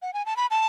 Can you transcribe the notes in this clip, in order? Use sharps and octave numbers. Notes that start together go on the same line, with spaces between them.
F#5
G#5
A5
B5
A5